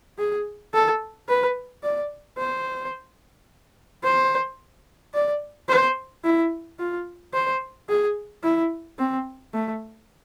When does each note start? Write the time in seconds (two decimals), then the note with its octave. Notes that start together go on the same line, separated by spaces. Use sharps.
0.18 G#4
0.73 A4
1.29 B4
1.83 D5
2.39 C5
4.04 C5
5.14 D5
5.69 C5
6.24 E4
6.79 F4
7.34 C5
7.89 G#4
8.44 E4
8.99 C4
9.54 A3